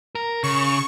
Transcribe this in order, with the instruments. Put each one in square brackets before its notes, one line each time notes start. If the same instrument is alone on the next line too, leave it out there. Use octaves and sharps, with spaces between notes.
[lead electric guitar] A#4
[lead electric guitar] C#3 [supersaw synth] C#6